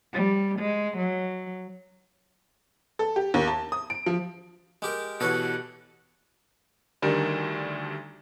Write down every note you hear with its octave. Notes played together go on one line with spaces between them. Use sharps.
G3
G#3
F#3
A4
G4
D#2
A5
D#6
D7
F3
G#3 G4 A#4
B2 E3 G4 A4 B4 C#5 F#5
D2 D#3 G3 D4